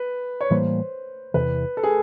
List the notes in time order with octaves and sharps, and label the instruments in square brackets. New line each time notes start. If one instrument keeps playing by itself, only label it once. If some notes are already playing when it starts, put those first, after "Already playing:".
Already playing: [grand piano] B4
C#5
[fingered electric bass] A2 E3 G3 A#3 [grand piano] C5
[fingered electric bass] E2 C3 E3 [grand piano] B4
[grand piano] A4
G#4